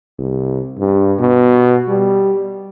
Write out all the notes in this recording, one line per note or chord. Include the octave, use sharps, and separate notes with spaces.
C2
G2
B2
G3